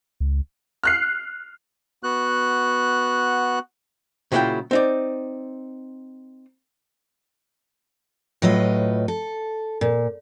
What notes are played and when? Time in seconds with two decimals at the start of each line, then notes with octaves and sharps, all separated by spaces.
0.20 C#2
0.84 F6 F#6 C7
2.03 B3 F#4 F#6
4.32 A#2 C#3 F#3 E4 F4 G5
4.71 C4 D#4 D5
8.42 A2 F#3 F4 B4 D#5
9.08 A4
9.81 A#2